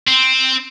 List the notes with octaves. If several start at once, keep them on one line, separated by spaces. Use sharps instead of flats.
C4